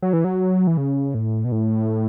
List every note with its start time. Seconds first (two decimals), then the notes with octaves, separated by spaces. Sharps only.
0.02 F#3
0.13 E3
0.24 F#3
0.67 E3
0.77 C#3
1.14 A2
1.45 B2
1.52 A2